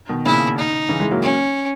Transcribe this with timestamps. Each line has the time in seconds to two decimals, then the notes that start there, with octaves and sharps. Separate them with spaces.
0.09 B2 D#3
0.25 A#2 C#3 E4
0.58 D#4
0.89 C#3 E3
1.00 E3 G#3
1.11 F#3 A#3
1.22 C#4